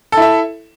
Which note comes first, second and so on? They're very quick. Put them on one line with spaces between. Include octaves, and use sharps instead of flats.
A4 E4 E5